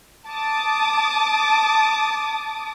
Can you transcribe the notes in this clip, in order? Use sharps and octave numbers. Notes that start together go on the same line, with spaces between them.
A5 D6 D#6